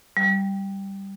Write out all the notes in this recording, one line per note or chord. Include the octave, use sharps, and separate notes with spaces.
G3